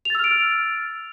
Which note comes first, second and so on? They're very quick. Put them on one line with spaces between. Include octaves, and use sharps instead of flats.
F7 A6 E6 F6 D7